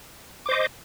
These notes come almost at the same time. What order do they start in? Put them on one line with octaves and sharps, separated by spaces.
D6 C5 D#5